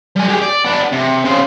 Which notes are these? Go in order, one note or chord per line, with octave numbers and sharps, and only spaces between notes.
G3 G#5
G4 G#4
D5
B3 D4
C3
C#3 C5